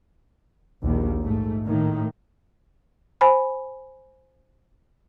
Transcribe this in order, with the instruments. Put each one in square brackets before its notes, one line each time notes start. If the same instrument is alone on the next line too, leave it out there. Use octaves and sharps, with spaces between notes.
[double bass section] A#1 D#2
G#2 A3
A2 D#3 A#3
[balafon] C5 G#5 B5